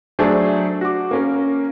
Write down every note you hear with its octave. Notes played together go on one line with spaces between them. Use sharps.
F#3 A3 D4 G#4 A4 C5
F#4 D6
A#3 C#4 A#4